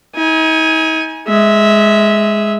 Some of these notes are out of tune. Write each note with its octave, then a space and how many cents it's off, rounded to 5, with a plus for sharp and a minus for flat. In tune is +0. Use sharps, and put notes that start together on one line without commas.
D#4 +40 G#5 +0
G#3 +0 E5 -15